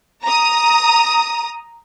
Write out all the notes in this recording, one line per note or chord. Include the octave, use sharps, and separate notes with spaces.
A#5 D#6